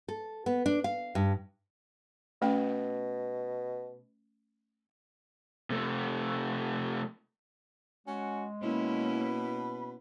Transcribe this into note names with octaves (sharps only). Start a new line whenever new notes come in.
A4
B3
D4
F5
G2
B2 A3 C#4 G5
C3 A3
G#3 C#4 F#4
B2 A#3 C#4 E4 B5